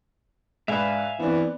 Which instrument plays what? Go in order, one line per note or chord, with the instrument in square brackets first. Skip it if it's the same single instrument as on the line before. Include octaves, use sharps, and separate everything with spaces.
[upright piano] G#2 D4 B4 [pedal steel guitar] E5 F5 G#5
[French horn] E3 [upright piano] B3 C4 D4